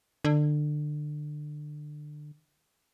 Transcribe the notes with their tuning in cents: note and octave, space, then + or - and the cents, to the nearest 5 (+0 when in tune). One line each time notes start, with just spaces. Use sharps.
D3 +25